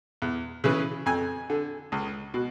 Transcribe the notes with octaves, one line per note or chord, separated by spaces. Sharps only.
E2
C#3 E3
F2 G#5
D3
C#2
B2